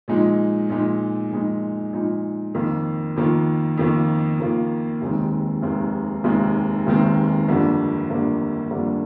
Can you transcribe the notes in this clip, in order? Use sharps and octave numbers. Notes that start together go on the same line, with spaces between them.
A#2 F3 G#3 D#4
A#2 F3 G#3 D#4
A#2 F3 G#3 D#4
A#2 F3 G#3 D#4
F2 D#3 A#3 F4
F2 D#3 A#3 F4
F2 D#3 A#3 F4
F2 D#3 A#3 F4
F1 D#2 D#3 G#3 C4
F1 D#2 D#3 G#3 C4
F1 D#2 D#3 G#3 C4
F1 D#2 D#3 G#3 C4
G1 F2 D3 G3 A#3
G1 F2 D3 G3 A#3
G1 F2 D3 G3 A#3